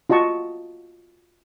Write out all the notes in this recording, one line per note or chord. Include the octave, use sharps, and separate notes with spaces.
F4 F#4 D#5 A5 C#6